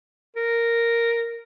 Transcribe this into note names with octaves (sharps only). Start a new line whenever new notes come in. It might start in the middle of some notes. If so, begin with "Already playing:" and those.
A#4